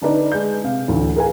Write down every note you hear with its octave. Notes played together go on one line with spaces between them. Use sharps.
D3 D4 D#4 B4 D5
G#3 G6
C3 F5
A1 D2
G#4 A#4 B4 F5 G#5